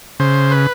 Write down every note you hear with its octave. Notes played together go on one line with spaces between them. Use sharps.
C#3 C5
B4